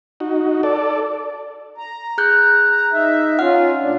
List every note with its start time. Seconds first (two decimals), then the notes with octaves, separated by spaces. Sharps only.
0.20 D#4 F#4
0.63 A4 D5
1.78 A#5
2.18 G#4 F#6 G6
2.71 A#5
2.93 D#4 E5
3.39 C#4 F4 F#5 F6
3.81 A#2 D4